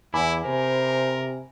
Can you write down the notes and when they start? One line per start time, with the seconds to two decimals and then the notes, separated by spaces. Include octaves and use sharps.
0.14 E2 E4 G#5 B5 D6
0.46 C3 A#4 C5